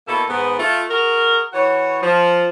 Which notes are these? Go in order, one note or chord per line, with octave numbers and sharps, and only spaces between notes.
B2 A#3 E4 A4
G#2 D#3 B3
A3 F4
F#4 G#4 A#4
E3 F#4 C#5
F3